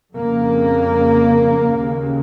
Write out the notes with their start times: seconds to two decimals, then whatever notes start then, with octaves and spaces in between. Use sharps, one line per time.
0.15 F2 C#3 A#3
1.75 D#2 C#3